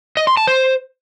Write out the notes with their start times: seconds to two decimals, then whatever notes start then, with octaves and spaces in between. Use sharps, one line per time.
0.17 D#5
0.27 C6
0.37 A5
0.47 C5